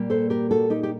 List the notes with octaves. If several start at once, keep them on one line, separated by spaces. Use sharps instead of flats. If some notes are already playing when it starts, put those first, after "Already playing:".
Already playing: A#2 G3 A#3
A4 C5
G4 A#4
F#4 A4
D#4 G4
G4